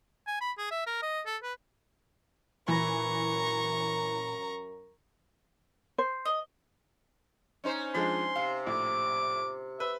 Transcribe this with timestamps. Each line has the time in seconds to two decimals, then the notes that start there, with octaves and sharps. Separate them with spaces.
0.27 G#5
0.41 B5
0.58 G#4
0.71 E5
0.86 A#4
1.02 D#5
1.26 A4
1.43 B4
2.68 F#2 A#2 E3 A#4 A#5 B5 C#6 A#6
5.98 C5
6.25 D#5
7.64 C#4 D#4 C5
7.94 F3 G#3 D4 C6
8.36 C3 F5
8.67 A#1 A2 D6
9.80 B4 E5